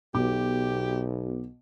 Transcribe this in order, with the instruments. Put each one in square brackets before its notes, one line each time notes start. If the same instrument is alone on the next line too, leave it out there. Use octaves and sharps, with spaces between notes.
[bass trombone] B1 [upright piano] B2 D6 [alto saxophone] G4